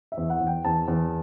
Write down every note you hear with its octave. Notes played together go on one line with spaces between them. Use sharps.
E5
E2
F#5
E2
G5
E2 A5
E2